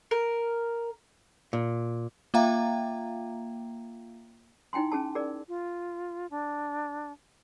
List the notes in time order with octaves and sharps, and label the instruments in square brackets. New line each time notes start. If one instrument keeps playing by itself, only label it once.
[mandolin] A#4
[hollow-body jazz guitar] A#2
[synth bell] A#3 F4 E5 F5 G5 A#5
[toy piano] D#4 E4 G5 G#5 C6
C#4 G#4 A5
G#4 A#4 D5
[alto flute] F4
D4